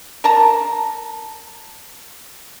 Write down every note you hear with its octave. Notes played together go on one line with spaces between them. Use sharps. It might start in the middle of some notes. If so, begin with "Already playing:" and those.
A#4 A5 A#5